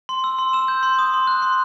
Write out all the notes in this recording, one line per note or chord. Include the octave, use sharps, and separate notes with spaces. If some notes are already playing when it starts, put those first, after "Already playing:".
C6
E6
C6
E6 E7
G6
C6
D#6
C6
F#6
C6